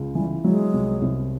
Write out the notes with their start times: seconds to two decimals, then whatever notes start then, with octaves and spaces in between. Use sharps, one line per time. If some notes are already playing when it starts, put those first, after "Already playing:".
Already playing: C#2
0.15 E3 G3
0.44 F#3 G#3
0.73 C2
1.02 C2